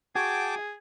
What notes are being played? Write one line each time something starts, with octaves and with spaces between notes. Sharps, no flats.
F#4 G#4 G5 A5 D6 G#6